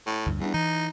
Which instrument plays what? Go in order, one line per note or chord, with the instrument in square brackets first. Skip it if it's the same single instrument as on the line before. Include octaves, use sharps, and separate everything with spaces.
[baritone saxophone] A2
[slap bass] D2 G2 A#2
[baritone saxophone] E2 [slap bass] G3 D4
[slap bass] E3 [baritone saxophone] D#4